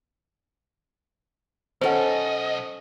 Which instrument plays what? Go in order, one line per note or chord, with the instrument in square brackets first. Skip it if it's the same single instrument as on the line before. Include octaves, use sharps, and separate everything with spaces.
[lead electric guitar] B1 D#5 [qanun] C#4 A4 [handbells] C5 F#5